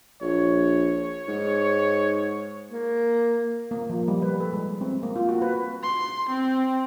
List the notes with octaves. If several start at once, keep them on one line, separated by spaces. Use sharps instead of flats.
A#1 C#5
G#2
A#3
A#3
F3
G3
B4
A4
G#3
C4
A#3
F4
F#4
B4
C6
C4